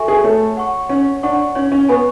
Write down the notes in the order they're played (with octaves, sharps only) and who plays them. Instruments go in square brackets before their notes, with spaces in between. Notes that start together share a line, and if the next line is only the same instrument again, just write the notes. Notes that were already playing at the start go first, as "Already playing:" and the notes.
Already playing: [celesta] F#4 A4 E5 G#5 C#6
[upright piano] G#4
[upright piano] A3 [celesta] C#5
[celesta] F#5 C#6
[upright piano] C#4 [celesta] C#5
[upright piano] D4 [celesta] F#5 C#6
[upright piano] C#4 [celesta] C#5
[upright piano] C#4
[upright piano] B3 [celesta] G#5
[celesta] C#6